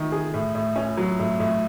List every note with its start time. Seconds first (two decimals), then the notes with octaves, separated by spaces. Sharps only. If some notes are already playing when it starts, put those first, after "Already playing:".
Already playing: D#3 A3
0.12 G#4
0.34 A2
0.55 A2
0.76 C#4
0.97 F#3
1.19 A2
1.39 A2